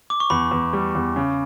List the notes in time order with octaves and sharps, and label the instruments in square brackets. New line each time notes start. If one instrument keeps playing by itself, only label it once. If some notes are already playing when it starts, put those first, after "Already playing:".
[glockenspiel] D6
C#6
[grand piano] E2 [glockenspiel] B5
[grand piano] E2
G3
E2
C#3